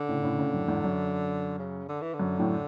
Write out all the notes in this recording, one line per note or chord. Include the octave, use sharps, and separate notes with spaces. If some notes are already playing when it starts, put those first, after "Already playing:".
Already playing: D3
A2 C#3
A2 C#3
A2 C#3
F#2 A2
E2 G#2
F#2
C#3
D3
E3
D3
F#2
F#2 A2